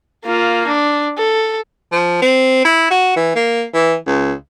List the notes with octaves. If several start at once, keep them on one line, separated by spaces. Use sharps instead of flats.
A#3 F4
D4
A4
F3
C4
E4
F#4
E3
A#3
E3
C#2